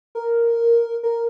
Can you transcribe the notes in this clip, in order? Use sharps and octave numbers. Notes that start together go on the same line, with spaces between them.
A#4
A#4